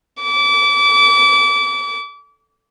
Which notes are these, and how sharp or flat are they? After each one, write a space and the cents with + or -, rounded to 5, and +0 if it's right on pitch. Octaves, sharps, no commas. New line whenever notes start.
D6 -30